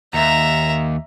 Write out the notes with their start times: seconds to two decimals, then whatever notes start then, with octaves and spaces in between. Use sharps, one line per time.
0.14 D#2 E5 A#5